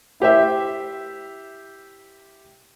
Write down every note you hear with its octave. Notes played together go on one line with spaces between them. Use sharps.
E4 G4 C5 E5